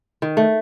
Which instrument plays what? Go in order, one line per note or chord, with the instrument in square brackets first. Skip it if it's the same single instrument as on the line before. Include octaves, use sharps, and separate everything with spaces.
[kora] D#3
A3